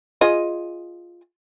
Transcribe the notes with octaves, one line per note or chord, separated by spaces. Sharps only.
F4 G#4 D#5